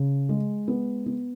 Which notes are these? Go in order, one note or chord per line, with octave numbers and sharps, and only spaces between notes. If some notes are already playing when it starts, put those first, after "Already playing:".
Already playing: C#3
G#3
B3
B3